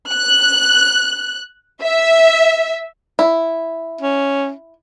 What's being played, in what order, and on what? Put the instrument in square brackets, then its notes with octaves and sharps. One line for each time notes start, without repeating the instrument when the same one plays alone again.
[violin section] F#6
E5
[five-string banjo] E4
[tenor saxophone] C#4